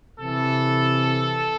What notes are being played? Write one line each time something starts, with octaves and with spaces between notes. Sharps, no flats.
C3 E3 A4